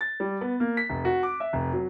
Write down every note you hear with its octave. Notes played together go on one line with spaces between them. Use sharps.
A6
G3
B3
A#3
B6
F1
F#4
D6
E5
F1
F#3